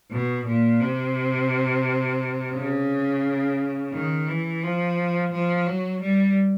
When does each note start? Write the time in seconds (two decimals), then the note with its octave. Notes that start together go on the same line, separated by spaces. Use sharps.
0.11 B2
0.46 A#2
0.80 C3
2.54 C#3
3.93 D#3
4.28 E3
4.62 F3
5.32 F3
5.66 F#3
6.02 G3